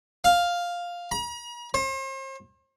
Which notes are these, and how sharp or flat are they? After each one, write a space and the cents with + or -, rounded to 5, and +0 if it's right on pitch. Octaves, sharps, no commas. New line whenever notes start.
F5 +5
A#5 +45
C5 +40